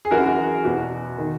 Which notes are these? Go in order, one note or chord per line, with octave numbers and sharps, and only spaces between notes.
G#4
F#2 E3 F#4 A#4
F#4
G#4
E2 B2 F#4
D#3